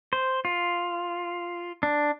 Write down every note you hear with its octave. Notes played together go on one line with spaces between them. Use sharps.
C5
F4
D4